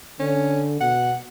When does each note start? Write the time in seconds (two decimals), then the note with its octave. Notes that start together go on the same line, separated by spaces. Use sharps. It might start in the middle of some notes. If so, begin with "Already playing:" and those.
0.20 D3 C#4
0.80 B2 F#5